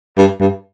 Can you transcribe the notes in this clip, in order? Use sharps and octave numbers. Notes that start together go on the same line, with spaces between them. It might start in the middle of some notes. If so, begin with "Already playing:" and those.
G2
G2